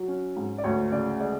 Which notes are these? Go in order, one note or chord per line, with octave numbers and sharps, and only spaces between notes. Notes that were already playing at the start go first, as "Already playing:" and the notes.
Already playing: F#3
C#4
G#2
D5
D2 C#5
C#3 D5
G#3 D5